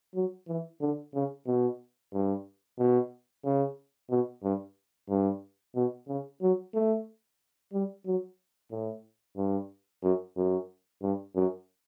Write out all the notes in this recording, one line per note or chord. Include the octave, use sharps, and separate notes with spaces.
F#3
E3
D3
C#3
B2
G2
B2
C#3
B2
G2
G2
B2
C#3
F#3
A3
G3
F#3
A2
G2
F#2
F#2
G2
F#2